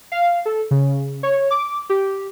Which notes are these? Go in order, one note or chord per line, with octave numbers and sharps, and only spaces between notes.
F5
A4
C#3
C#5
D6
G4